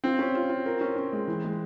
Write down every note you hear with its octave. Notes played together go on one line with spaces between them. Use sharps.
C4 F4
C#4
F4
F4
A#4
C#4
C#4
G#3
E3
G#3